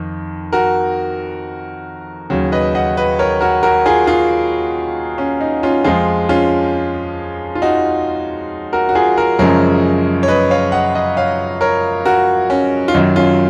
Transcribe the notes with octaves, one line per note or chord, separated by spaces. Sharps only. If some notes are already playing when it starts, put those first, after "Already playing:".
Already playing: F2 D#3
F#4 A#4
D#2 C#3 F#3
B4 D#5
D#5 F#5
B4 D#5
A#4 C#5
F#4 A#4
F#4 A#4
F4 G#4
F4 G#4
C#4
D#4
C#4 F4
F2 F3 G#3 F4 G#4
C#4 F4
F4
D#4 F#4
F#4 A#4
F#4
F4 G#4
F#4 A#4
F#2 C#3 F3 G#3 A#4 C#5
C#5
B4 D#5
C#5 F5
D#5 F#5
D#5 F#5
C#5 F5
A#4 C#5
F#4 A#4
C#4
F4
F#2 D#3 F#3 D#4
C#4 F4